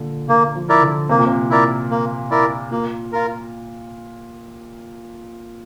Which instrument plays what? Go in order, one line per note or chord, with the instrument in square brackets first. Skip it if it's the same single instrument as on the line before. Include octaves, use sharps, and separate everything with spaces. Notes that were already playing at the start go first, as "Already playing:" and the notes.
Already playing: [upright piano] A#2 D3
[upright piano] D3 [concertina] A#3
[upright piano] F3
[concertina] E4 A#4 D5
[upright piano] D3
[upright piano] C3 [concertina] A#3
[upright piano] A#2
C3
[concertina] E4 A#4 D5
A#3
E4 A#4 D5
[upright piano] A#2 [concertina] A#3
[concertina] F4 A#4